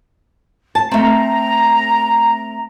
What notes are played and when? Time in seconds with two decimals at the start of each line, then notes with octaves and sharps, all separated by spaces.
0.75 A5
0.91 A3 C4 A#5